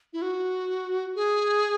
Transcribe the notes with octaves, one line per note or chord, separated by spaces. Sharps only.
E4
F#4
G#4